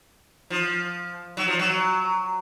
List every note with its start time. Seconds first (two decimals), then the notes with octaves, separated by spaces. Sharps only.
0.50 F3
1.37 F#3
1.48 F3
1.59 F#3